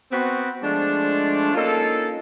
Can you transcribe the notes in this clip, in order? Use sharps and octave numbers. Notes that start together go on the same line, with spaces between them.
B3 C4 F#4
F3 G#3 A3 D4
A#3 C#4 D#4 F4 A4